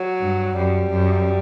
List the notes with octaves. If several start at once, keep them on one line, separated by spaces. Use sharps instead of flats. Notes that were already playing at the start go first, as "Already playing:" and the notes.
Already playing: F#3
G2
F#2 G3
F#2